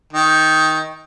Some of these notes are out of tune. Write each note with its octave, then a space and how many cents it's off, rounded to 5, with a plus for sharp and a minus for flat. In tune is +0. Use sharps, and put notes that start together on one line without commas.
D#3 +10